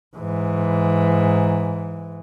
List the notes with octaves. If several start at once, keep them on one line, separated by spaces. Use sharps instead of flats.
G#2 E3